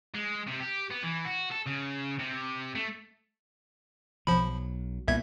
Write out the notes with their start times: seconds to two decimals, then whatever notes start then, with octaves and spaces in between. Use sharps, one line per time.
0.14 G#3
0.47 C3
0.60 G4
0.90 B3
1.03 E3
1.25 F#4
1.51 A4
1.66 C#3
2.19 C3
2.75 A3
4.27 B1 F3 F#3 B5
5.08 C2 A#2 B3 E5 G#6